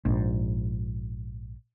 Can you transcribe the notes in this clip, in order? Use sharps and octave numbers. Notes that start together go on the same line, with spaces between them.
A#1 G#2